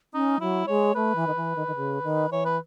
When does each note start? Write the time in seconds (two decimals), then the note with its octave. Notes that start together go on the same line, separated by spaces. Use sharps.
0.14 C#4 D#4
0.40 F#3 E4
0.67 G#3 C#5
0.95 A3 B4
1.15 E3
1.27 D#3
1.35 E3
1.56 D#3
1.67 D#3
1.76 C#3
2.03 D#3
2.30 E3 C#5
2.45 B4